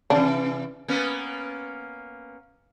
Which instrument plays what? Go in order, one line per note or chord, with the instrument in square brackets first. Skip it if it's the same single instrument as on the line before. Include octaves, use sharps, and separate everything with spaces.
[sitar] C3 E3 [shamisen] D4
[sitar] A#3 B3 C#4